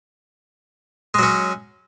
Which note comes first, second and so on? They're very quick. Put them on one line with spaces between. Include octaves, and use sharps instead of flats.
G#3 F#3 C#4